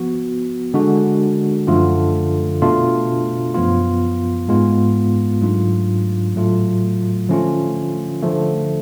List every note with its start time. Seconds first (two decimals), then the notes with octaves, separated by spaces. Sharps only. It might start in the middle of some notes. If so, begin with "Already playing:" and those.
Already playing: F3 B3 F#4
0.74 D3 G#3 D4 F#4
1.67 F#2 D3 F3 A3 F4
2.62 B2 A3 D4 F4
3.54 F#2 F3 B3 F4
4.48 G#2 G#3 B3 F4
5.42 G#2 F#3 A3 D4 F4
6.35 A2 F#3 A3 F4
7.29 D3 F3 A3 C#4 F4
8.23 D3 F3 A3